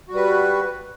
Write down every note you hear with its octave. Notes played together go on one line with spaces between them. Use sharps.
G3 F#4 B4